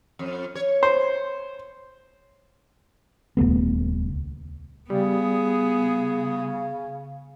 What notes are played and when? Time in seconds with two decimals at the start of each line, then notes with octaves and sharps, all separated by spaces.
0.19 F2
0.55 C#5
0.83 C5
3.37 D#1 C#2 A3 B3
4.90 C#3 G3 B3 G#4